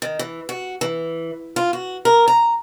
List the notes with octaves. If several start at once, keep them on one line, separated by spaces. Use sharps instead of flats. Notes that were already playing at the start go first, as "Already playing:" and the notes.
D#3
E3
F#4
E3
F4
F#4
A#4
A#5